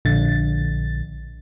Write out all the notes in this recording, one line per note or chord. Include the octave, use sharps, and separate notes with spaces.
A#1 D3 A6